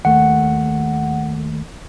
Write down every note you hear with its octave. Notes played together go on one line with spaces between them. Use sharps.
D#2 A3 F#5